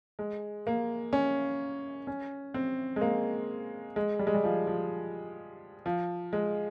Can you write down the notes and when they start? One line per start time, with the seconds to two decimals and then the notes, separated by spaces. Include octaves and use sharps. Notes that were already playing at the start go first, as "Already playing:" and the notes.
0.19 G#3
0.67 A#3
1.13 C#4
2.07 C#4
2.54 C4
2.96 G#3
3.01 A#3
3.96 G#3
4.19 G3
4.27 G#3
4.34 G3
4.44 F3
4.67 F3
5.86 F3
6.33 G#3